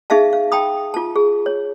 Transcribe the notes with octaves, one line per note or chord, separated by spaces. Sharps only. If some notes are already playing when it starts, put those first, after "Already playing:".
D#4 G#4 E5 F5 A5
F5
G5 A5 B5 D#6
F4 A5
G#4
C#5